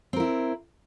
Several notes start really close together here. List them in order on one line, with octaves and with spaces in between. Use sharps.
C4 A#4 E4